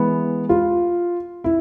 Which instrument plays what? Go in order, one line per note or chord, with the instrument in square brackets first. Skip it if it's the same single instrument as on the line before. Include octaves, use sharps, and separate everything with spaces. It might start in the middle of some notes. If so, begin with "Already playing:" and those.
Already playing: [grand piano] E3 G#3 B3
[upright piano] F4
E4